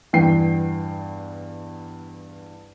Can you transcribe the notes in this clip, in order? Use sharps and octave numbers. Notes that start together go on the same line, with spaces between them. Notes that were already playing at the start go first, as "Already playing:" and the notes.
E2 G2 E3 G5 C7